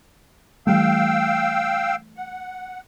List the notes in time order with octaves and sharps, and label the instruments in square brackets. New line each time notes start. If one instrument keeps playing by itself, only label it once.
[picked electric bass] E3 G3 A3 [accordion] F5 G5 E6
[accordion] F#5